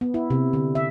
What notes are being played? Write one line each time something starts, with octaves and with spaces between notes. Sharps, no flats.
B3
E4
C3
D3
E5